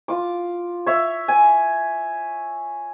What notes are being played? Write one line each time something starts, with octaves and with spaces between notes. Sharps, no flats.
F4 D6
C#5 E5
G#5